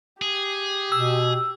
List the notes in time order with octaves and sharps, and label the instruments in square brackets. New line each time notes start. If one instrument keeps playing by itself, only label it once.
[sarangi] G4 [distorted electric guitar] G#4
[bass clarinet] B2 [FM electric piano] E6